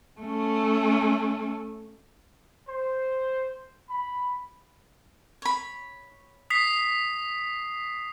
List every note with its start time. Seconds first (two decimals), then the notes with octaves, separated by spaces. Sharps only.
0.21 A3 C#4
2.68 C5
3.90 B5
5.42 C#5 B5
6.50 D#6 B6 C7